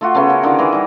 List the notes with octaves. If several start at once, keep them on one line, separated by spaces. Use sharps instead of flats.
A3 F4 F#4
C#3 A3 B3 C#4
G#4 A#4
D3 D#3 F4
E3 G#4 A#4 F#5
G3 D#4